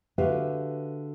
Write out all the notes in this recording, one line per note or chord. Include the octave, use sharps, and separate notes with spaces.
D3 F#4 G4 B4 E5 F5